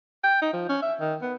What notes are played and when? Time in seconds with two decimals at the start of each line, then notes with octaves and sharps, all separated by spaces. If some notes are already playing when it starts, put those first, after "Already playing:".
0.24 G5
0.42 D#4
0.53 F3
0.69 C#4
0.82 E5
1.00 D#3
1.22 B3